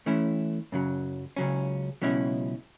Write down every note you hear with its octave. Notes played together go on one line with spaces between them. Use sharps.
E3 A3 C#4 E4
F#2 C#3 F#3
C#2 C#3 F#3 C#4
C#2 B2 F#3 C#4 E4